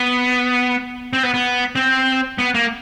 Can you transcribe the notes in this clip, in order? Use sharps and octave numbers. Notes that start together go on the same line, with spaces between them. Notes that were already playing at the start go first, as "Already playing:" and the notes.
Already playing: B3
C4
B3
B3
C4
B3
A#3